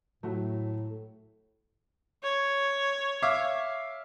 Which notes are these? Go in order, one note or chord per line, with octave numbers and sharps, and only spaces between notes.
A2 F#3 A3 F#4
C#5
E5 F5 D6